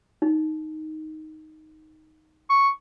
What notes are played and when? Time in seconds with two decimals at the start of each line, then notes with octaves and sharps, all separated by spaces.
0.22 D#4
2.50 C#6